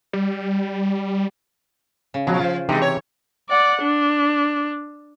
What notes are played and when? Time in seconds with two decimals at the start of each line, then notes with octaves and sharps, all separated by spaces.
0.13 G3
2.14 C#3
2.27 B2 F3 F#3
2.41 F4 C5
2.69 C3 E3 G#3 D#4 G4
2.82 C#5
3.50 D5 F#5
3.82 D4